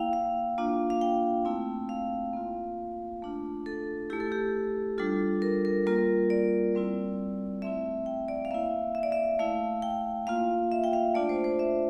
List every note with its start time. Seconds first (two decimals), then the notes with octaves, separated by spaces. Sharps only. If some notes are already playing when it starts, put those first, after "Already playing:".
Already playing: A#3 E4 F5 G5
0.13 F5
0.58 A#3 D4 F4
0.90 F5
1.01 G5
1.45 A3 C4 E4
1.89 F5
2.33 A#3 F4
3.22 A3 D4 F4
3.66 A4
4.10 A3 E4 G4
4.20 A4
4.32 G4
4.98 G3 D4 F4 A4
5.42 A#4
5.65 A#4
5.86 G3 A#3 F4 A#4
6.30 D5
6.75 G3 C4 E4
7.62 A3 C4 E4 E5
8.06 G5
8.28 D5
8.45 F5
8.51 A#3 E4 E5
8.95 E5
9.03 D5
9.12 E5
9.39 A3 E4 F5
9.82 G5
10.27 A#3 F4 F5
10.72 E5
10.84 G5
10.93 F5
11.15 A3 D4 F4 D5
11.29 C5
11.44 C5
11.59 E5